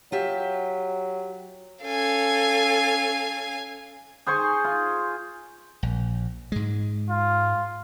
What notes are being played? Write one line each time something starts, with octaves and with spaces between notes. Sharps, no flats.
F#3 F4 G4 E5
C#4 A4 F5 G#5
G#4 C5 G#5 C#6
F4
A#1
G#2 G#3
F4